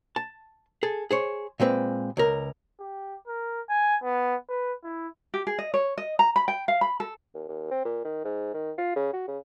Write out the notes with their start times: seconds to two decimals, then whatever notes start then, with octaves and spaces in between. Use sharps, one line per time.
0.16 A5
0.83 G#4 A4
1.11 G#4 C5 C#5
1.60 A#2 G#3 C4 B4
2.17 C#2 A#4
2.80 G4
3.27 A#4
3.69 G#5
4.03 B3
4.49 B4
4.84 E4
5.34 G4
5.47 G#4
5.59 D#5
5.74 C#5
5.98 D#5
6.19 A#5
6.36 B5
6.48 G5
6.68 F5
6.81 B5
7.00 A4
7.34 D#2
7.49 D#2
7.71 C4
7.85 A#2
8.05 D#3
8.24 G#2
8.54 D#3
8.78 F4
8.96 C#3
9.13 F#4
9.28 C#3